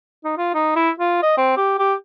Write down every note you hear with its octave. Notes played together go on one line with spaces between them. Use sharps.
D#4
F4
D#4
E4
F4
D#5
C4
G4
G4